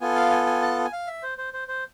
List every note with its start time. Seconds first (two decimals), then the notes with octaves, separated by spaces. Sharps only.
0.01 B3 F4 A4 G#5
0.16 F5
0.31 G#5
0.46 G#5
0.62 A5
0.85 G#5
0.92 F5
1.07 E5
1.23 C5
1.38 C5
1.53 C5
1.68 C5